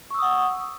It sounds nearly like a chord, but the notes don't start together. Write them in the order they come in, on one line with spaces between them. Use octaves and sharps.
C#6 E6 D#6 F#5